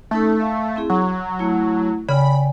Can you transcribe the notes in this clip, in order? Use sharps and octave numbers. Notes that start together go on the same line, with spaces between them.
A3 C#4 D#4 A4
E5 F5
C4 E4 G#4
F#3 C#6
A3 E4
C#3 D5 G5 G#5 B5